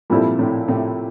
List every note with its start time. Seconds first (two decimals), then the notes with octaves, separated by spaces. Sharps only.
0.10 A#2 F3 G3 A#3 C4 E4 A4
0.39 A2 C3
0.68 A2 C3